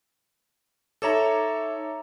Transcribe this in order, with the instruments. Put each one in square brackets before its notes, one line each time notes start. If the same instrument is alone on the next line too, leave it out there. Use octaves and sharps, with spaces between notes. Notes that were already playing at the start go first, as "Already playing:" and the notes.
[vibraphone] D#4 E5 D6 [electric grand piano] A4 C#5 A#5